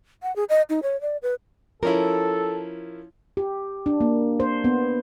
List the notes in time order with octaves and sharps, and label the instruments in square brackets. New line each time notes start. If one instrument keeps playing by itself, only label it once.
[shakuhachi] F#5
G#4
D#5
D#4
C#5
D5
B4
[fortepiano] F3 C#4 E4 [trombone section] A4 [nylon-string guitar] A#4
[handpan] G4
D4
A#3
C5
B3